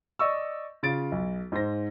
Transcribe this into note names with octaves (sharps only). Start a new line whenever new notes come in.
D5 D#5 C#6 E6
C#3 F4 A6 D7
B1
G#2 C5 A#6